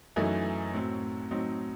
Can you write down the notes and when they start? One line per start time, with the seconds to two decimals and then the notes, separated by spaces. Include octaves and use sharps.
0.16 F#2 E3 A3 D#4
0.74 A2 F#3 C4
1.31 A2 F#3 C4 D#4